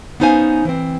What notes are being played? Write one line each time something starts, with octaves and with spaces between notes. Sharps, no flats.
B3 C#4 D#4 C5 F5 G#5
E3 C4